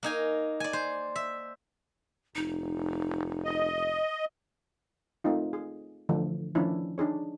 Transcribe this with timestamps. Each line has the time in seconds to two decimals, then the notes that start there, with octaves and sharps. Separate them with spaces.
0.03 A#3 D#4 G#5
0.60 D5 G#5
0.73 C5
1.16 E5
2.35 F1 D#4
3.45 D#5
5.24 A3 C4 D#4 F4
5.53 G#4
6.09 D3 E3 F3 A3
6.55 D#3 F3 A3 C#4 D4 E4
6.98 D4 D#4 G#4 C#5